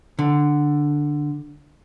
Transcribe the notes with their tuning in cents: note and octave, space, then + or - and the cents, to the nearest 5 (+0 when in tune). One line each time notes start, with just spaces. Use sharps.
D3 +5